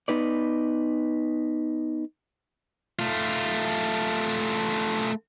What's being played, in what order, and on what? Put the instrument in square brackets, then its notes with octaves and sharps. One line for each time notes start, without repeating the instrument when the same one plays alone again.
[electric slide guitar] B3 D#4 B4 D5
[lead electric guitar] A3 F4